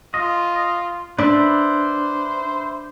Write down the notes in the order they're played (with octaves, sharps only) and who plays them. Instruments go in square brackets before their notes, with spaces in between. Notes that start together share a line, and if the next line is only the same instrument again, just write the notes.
[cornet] F4 [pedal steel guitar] D#5
[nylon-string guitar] D4 [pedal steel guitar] B4 D5 E5 [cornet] C5